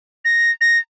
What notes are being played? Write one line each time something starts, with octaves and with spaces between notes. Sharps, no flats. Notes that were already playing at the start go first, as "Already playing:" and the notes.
A#6
A#6